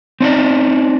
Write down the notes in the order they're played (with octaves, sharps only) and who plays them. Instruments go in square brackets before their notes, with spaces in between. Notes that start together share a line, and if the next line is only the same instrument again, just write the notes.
[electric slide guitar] C4 C#4 D#4 D5